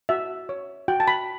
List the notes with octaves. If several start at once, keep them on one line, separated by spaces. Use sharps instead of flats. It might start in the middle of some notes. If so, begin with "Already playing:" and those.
F#4 E5
C#5
F#4 G5
A5
B5